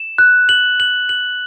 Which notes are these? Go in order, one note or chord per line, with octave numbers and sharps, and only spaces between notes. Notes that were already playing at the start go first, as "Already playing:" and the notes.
Already playing: E7
F#6
F#7
F#7
F#7